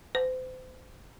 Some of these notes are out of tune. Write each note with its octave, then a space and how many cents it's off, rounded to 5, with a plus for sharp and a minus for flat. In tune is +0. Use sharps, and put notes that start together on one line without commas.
C5 -35